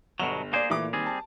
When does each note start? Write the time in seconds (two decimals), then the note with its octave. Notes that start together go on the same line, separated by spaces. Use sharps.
0.20 G1 B2 F#3 E7 F7
0.53 A#3 G#4 C5 D5 D7
0.70 A#2 E3 A3 D6
0.93 D#2 G3 C4 G#4
1.06 A5